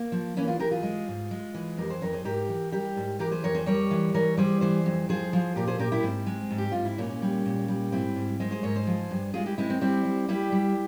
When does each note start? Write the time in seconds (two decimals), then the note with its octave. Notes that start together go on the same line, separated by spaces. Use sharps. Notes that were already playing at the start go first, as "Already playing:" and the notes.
Already playing: A#3
0.12 F3
0.37 E3 A#3 C#4
0.47 F4 G#4
0.60 E3 G4 A#4
0.71 F4 G#4
0.83 G#3
1.08 G#2
1.31 G#3
1.54 E3
1.77 F2 G4 A#4
1.90 G#4 C5
2.01 F2 A#4 C#5
2.13 G#4 C5
2.25 G#2 G4 A#4
2.49 E3
2.72 G3 G4 A#4
2.96 G#2
3.19 E3 G4 A#4
3.31 G#4 C5
3.43 F2 A#4 C#5
3.55 G#4 C5
3.66 G3 A#4 C#5
3.91 E3
4.14 E3 A#4 C#5
4.37 G3 G#4 C5
4.61 E3 G#4 C5
4.86 F2
5.09 F3 G#4 C5
5.33 F3
5.56 A#2 G4 A#4
5.67 G#4 C5
5.79 A#2 G4 A#4
5.92 E4 G4
6.03 G#2 C4
6.26 G#3
6.51 G#2
6.58 G4
6.72 G#2 F4
6.85 E4
6.98 A#2 A#3 C#4
7.22 G3
7.45 A#2
7.68 G3
7.92 G#2 C4 E4
8.16 G#2
8.40 G#3 G#4 C5
8.51 G#4 C5
8.63 G#2 A#4 C#5
8.76 G#4 C5
8.87 F3
9.11 G2
9.34 G#3 F4 G#4
9.46 E4 G4
9.58 G#3 C4 E4
9.70 C4
9.81 G3 C4 E4
10.05 G3
10.29 G3 E4 G4
10.52 G3